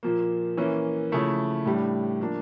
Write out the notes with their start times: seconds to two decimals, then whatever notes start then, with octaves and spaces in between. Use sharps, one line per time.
0.03 A#2 F3 A#3
0.57 E3 A#3 C#4
1.12 C#3 F3 A3 E4
1.65 A2 G3 D4
2.21 F3 A#3 D4